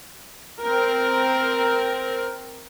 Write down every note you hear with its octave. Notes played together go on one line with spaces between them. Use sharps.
C4 A#4